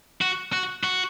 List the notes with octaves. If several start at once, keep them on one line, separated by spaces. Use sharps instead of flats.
F#4
F#4
F#4